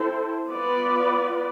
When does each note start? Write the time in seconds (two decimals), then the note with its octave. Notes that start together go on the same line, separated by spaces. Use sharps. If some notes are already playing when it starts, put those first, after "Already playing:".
Already playing: C4 E4 A4 C5
0.49 B3 F4 B4 D5